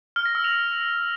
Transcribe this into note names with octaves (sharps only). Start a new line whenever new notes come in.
F6
A#6
E6
F7